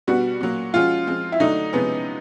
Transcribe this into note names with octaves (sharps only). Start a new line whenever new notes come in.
B2 G3 B3 D4 F#4
A#2 F#3 A#3
F3 G#3 C#4 F4 F#4
F3 G#3 C4
E4
D3 F#3 A3 D4 D#4
C3 F3 G#3 B3 C#4